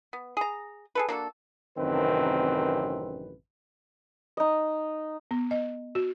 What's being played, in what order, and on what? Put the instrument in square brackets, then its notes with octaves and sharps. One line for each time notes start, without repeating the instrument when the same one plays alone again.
[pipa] B3
G#4 A#5
G#4 A4 B4
A#3 D4 F#4 A4
[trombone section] A1 F#2 C3 D#3 C4 B4
[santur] D#4 D#5
[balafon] B3
D#5
F#4